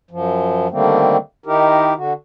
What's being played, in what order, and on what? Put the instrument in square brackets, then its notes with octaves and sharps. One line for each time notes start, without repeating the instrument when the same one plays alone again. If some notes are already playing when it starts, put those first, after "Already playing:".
[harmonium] F#2 F3
D3 D#3 G3 A3 A#3 C4
D#3 D#4 E4 G4 A#4
D3 F#4